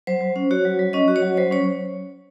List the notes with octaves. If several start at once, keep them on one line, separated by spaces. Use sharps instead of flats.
F#3 C5
F#3
C#4
F#4 C#5
F#3
F#3
C#4 D#5
F#4
C#5
F#3
F#3 C5
C#4 C#5